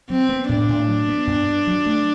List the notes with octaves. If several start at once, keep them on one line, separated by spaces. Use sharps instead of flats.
F#3 C4
B3
A2 D4
A2
F#3
B3
G2
G2
F#3
A3